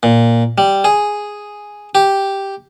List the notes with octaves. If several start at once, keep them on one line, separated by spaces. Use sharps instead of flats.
A#2
G3
G#4
G4